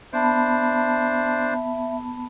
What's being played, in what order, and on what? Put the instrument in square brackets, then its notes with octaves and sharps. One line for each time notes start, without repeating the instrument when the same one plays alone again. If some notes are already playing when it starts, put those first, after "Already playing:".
[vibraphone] B3 A5 B5 [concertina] D4 C5 [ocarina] E5